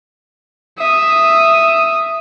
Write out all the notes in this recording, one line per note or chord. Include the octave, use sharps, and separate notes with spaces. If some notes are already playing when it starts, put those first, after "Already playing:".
E5 D#6